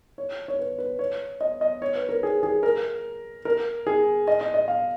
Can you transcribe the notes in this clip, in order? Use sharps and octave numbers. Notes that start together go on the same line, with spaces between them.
C#5
C#5
B4
B4
C#5
D#5
D#5
C#5
B4
A#4
G#4
G#4
A#4
A#4
G#4
D#5
D#5
D#5
F5